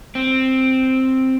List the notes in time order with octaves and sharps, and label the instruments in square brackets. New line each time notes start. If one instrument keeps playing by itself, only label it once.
[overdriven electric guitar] C4